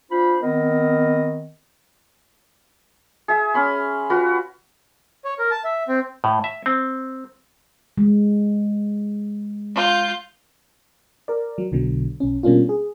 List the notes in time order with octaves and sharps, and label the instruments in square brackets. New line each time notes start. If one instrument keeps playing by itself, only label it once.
[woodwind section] D4 F4 C5 B5
D#3 B3 C4 A#4 D#5
[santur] G#4 E5
C#4 B5 C6
F4 F#4 B4
[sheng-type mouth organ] C#5
A#4
A5
E5
C4
[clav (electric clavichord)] A2
E5
C4
[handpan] G#3
[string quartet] F4 G6
[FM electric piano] A#4 D5
F#3
B1 B2 D3 F#3
B1 C#4
B2 G3 A#3 C#4 D4 F4
G#4